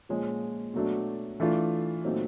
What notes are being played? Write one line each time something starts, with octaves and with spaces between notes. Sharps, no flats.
A#2 F3 G#3 C#4
B2 F#3 A3 D4
E3 A3 D4 F4
A#2 F#3 A3 C4 D#4